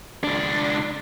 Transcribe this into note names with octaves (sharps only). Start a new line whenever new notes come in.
C#2 D4